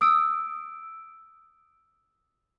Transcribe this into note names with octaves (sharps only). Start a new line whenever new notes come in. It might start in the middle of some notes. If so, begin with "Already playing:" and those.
D#6 E6 D7